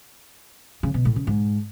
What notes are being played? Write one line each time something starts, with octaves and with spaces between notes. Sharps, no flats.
C#3
B2
A2
C#3
G#2